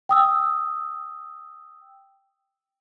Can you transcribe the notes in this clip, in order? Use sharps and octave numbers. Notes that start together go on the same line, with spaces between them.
G5 D#6 E6